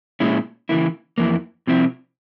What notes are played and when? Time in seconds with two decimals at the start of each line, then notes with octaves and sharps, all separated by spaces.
0.20 A#2 G#3 C#4 E4
0.69 C#3 E3 A#3 E4
1.18 F2 E3 A#3 E4
1.67 C3 F3 C4 E4